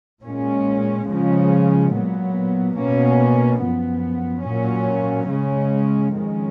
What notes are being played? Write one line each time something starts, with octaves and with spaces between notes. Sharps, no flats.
A#2 G#3 C#4
C#3 F3 G#3 C#4
A#2 F#3 B3
B2 A#3 C#4
F#2 F3 B3
A#2 F#3 C#4
C#3 G#3 C#4
F2 D#3 G#3 C#4